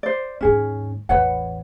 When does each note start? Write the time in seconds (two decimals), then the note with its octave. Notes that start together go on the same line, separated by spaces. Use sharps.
0.03 C5 D5
0.41 D#2 G#2 C#4 G#4
1.09 A1 E2 B4 C#5 F#5